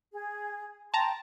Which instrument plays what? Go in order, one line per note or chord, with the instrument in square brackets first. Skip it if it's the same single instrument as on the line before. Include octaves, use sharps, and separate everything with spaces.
[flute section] G#4
[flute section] G5 C6 [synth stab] A5 A#5